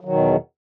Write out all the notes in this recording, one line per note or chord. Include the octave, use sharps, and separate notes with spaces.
E2 B2 D#3 F#3